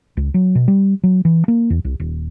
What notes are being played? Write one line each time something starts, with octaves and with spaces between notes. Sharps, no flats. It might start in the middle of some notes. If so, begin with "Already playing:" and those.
C#2
F#3
B2
G3
F#3
E3
A#3
E2
C2
D#1